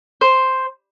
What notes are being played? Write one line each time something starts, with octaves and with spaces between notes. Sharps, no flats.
C5